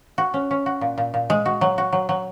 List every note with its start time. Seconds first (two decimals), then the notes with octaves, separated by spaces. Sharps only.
0.18 F#4
0.34 C#4
0.51 C#4
0.66 F#4
0.81 A#2
0.98 A#2
1.14 A#2
1.30 G#3
1.46 F#4
1.61 F#3
1.78 F#4
1.93 F#3
2.09 F#3